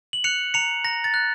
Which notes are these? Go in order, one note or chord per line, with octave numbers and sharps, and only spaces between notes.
F#7
F#6 C#7 F7
A#5 C#7 F7
A#5 A#6
A6
F#6